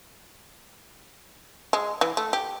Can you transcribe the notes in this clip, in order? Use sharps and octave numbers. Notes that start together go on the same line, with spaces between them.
G#3
E3
A3
G4